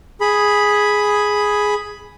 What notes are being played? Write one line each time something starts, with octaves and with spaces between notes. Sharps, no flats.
G#4 B5